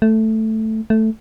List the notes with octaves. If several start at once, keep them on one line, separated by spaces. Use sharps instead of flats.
A3
A3